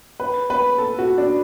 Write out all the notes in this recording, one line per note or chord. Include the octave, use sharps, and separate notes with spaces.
B4
B4
A4
F#4
D4